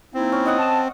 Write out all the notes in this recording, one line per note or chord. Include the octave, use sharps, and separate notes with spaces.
A#3 C4 D#4 E4
C#4
D#5 F#5 D#6
A5